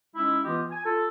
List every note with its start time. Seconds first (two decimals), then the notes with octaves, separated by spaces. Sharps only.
0.15 G#3 C#4 D#4 E4
0.44 E3 B3 F4 G4 D#5
0.69 G#5
0.84 F4 A4